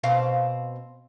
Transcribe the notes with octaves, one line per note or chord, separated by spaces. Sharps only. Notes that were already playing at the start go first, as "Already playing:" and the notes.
B2 C4 F5